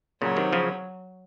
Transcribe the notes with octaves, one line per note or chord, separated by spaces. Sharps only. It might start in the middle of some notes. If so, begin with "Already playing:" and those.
A#2 C#3 F#3
C3 D#3
C#3 F3